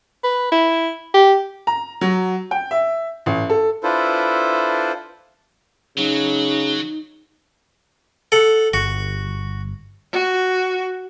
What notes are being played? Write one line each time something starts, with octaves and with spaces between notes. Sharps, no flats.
B4
E4
G4
A#5
F#3
G5
E5
A1
A4
D4 E4 F4 A4 B4 C5
C#3 F#3 D#4
A4 F#5
G1 F#4
F#4